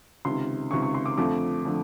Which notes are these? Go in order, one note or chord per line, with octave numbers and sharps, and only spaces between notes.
C#2 C3 D#3 C6
C#2 C3 D#3 C#6
C#6
C6
D6
F2 D3 F3 A3 D6
D3 F3 A3